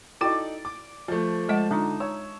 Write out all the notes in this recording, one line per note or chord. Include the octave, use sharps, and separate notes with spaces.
D#4 E4 F#4 A4 D5 G5
D6
F3 A3
G#3 D#5 F#5 A5
D3 G#3 D4 D#4 F4
C#5 E6